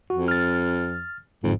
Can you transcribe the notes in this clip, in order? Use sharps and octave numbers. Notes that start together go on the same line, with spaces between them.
F2 F#4
F6 A6
G1 F2 G#2